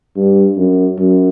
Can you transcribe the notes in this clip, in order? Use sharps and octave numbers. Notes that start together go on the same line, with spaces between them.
G2
F#2
F#2